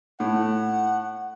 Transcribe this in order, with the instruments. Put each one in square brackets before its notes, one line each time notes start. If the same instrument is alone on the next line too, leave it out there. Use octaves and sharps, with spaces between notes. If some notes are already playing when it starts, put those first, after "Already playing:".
[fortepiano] A2 [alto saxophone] F#5